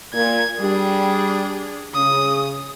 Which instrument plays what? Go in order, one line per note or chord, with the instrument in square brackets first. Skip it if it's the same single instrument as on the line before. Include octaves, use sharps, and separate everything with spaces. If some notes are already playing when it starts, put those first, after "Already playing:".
[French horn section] A#2 [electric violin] G#6
[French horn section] G3 [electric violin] D4 G#4
[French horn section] C#3 [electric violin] D#6